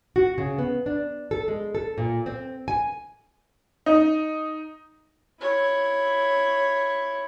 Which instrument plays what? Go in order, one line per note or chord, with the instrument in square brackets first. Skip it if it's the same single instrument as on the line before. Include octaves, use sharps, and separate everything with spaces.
[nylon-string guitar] F#4
C#3
B3
D4
A4
G#3
A4
A#2
C4
G#5
[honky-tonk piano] D#4
[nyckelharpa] E4 C#5